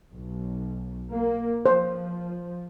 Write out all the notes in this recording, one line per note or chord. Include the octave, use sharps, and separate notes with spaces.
B1
A#3
F3 C5